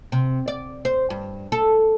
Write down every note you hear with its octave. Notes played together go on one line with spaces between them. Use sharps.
C3
D5
C5
G2
A4